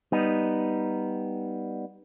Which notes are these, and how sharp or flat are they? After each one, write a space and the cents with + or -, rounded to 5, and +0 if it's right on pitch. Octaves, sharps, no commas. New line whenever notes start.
G3 +0 B3 -5 D#4 +0